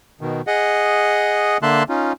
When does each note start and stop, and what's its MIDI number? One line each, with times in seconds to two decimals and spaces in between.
0.21 0.41 47
0.21 0.41 51
0.47 1.57 68
0.47 1.57 75
0.47 1.57 78
1.63 1.83 50
1.63 1.83 58
1.63 1.83 76
1.63 1.83 81
1.63 1.83 84
1.63 1.83 90
1.89 2.13 61
1.89 2.13 63
1.89 2.13 65